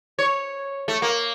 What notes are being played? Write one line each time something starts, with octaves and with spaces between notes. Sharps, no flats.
C#5
A3
A#3